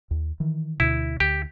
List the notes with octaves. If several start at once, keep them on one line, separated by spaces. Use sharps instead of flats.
D#2
D#3 E3
D2 B2 E4
D2 G4